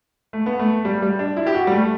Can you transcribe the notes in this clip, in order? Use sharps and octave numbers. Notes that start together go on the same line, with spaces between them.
A3
B3
A3
G3
G3
D4
E4
G4
F#4
G3
A3